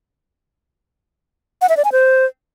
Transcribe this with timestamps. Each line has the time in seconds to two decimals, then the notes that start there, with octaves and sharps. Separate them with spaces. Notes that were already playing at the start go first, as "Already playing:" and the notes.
1.62 F#5
1.69 E5
1.77 D5
1.84 G#5
1.92 C5